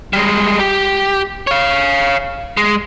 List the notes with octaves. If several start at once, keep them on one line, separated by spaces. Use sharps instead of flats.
G3 G#3
G4
C#5 F5
G#3